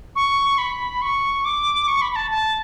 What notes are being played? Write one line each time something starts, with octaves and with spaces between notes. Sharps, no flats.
C#6
B5
C#6
D6
C#6
B5
B5
A5
A5